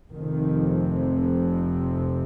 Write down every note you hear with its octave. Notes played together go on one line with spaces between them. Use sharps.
F1 F2 C3 D#3